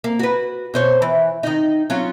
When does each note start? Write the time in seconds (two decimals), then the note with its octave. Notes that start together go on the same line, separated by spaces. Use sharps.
0.04 A#3
0.19 F#4 B4
0.74 B2 C5 C#5
1.02 E3
1.43 D#3 D#4
1.90 F#3 C#4 F4